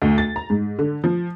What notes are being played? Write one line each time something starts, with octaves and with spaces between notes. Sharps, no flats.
D2
A6
A#5
G#2
D3
F3